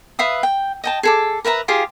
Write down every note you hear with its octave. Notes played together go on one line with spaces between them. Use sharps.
B4 E5 F5 D#6
G5
D#5 G5 A5
G#4 A4 D6
A#4 B4 E5 A#5
F4 G4 G#4 F5